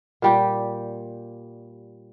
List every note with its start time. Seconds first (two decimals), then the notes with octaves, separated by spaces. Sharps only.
0.22 A#2 G3 G4